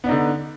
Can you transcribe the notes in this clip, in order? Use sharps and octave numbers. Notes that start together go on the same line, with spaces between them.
D3 B3 D4 D#4